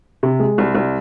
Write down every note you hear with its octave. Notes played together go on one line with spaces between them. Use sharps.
C3
G#3
C2
C2